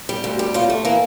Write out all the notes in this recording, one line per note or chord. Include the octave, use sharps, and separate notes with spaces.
G3
D2
G3
A2 F4
A3
E3 A#3